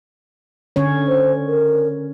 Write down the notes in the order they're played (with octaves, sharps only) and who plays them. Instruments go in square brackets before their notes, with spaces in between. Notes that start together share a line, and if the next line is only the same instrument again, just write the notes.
[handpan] D3 C#4 C#5
[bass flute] C5
A#4